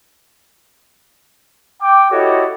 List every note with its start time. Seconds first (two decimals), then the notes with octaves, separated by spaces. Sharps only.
1.82 G5 D6
2.11 E4 F#4 G4 A4 C#5 D#5